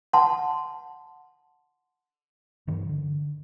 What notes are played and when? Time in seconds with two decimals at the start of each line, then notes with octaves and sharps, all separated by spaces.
0.13 F#5 A5 C6
2.67 G2 D#3 E3 F#3
2.89 D3